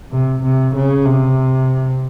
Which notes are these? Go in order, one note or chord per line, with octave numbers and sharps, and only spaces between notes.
C3
C3
C#3
C3